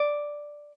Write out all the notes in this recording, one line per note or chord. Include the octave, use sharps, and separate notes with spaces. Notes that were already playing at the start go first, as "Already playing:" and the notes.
Already playing: D5